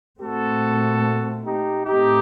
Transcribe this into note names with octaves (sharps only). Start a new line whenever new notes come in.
A#2 A3 C4 F#4 A4
D#4 G4
A2 A3 C4 D#4 G4